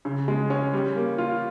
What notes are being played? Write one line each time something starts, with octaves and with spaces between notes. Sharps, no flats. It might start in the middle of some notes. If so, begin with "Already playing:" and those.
C#3
G#3
C#4
G3
A#3
F4